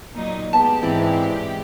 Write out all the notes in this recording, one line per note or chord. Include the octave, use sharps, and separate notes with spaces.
A#2 F#3 D#4
G#3 B3 G4 A5
G#2 E3 C4 D5